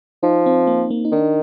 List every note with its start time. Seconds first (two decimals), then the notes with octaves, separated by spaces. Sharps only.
0.23 F3 D#4
0.46 C4
0.67 A#3
0.90 A#3
1.05 D#4
1.12 D#3 D4